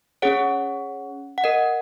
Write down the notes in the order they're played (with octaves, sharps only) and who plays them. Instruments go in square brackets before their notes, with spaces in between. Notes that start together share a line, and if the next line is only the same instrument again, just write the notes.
[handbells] C#4 G#4 C#5 F#5
F#5
A#4 D#5